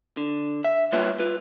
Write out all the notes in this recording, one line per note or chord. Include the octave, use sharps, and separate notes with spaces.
D3
E5
G3 A#3 F4 B4 C#5 E5
F4 B4